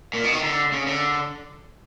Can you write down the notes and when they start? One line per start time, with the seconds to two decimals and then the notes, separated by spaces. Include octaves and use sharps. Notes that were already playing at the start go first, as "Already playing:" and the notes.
0.13 A#2
0.23 B2
0.33 D#3
0.43 D3
0.72 C#3
0.87 D3